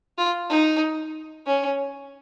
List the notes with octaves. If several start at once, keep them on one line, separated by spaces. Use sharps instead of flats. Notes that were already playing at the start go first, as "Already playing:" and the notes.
F4
D#4
C#4